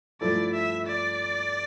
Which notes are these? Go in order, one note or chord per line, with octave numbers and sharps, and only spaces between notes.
G2 F3 A3 E4 A4 D5
E5
D5